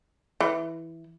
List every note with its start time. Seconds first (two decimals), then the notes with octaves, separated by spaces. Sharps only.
0.41 E3